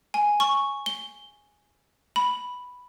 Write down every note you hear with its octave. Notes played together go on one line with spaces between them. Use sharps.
G#5
C#6
G7
B5